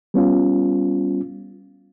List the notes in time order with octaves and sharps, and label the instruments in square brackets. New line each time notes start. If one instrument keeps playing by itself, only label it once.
[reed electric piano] G3 B3 C#4 F4